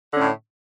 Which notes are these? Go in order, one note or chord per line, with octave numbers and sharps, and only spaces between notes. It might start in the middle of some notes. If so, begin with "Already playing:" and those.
A2 D3 C#4